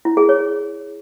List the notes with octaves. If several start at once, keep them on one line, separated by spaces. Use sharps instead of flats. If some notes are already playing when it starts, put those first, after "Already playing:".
E4
G#4
C#5